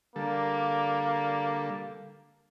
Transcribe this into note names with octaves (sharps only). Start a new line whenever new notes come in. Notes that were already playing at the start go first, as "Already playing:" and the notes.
D3 G3 A#3 A4